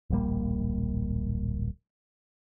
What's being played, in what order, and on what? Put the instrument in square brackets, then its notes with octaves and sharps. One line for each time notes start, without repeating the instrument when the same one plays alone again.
[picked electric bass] D1 A#1 G3 A#3